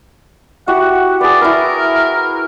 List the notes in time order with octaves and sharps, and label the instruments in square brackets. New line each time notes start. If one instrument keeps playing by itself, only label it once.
[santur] E4 F#4 G4 [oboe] F#5
[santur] G#4 B4 [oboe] D5
[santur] E4 B4 [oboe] A#4